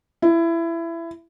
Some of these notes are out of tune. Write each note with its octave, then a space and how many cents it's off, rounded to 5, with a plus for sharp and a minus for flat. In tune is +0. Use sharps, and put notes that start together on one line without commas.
E4 +20